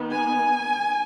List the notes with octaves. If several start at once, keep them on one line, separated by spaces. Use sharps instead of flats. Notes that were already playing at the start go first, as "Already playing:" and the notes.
Already playing: D#3 B3
G#5